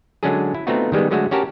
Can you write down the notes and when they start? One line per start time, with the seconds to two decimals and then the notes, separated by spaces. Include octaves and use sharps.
0.23 D3 F#3 G#3 C#4 D4 G#4
0.55 E4
0.67 A3 B3 C4 D#4 F4 F#4
0.92 D#3 G3 G#3 B3
1.11 D3 F#3 G#3 A3 F#4
1.31 C#4 F#4 G4 A#4 A5